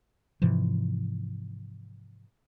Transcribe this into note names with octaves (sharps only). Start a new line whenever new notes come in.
G#2 C3 E3 F3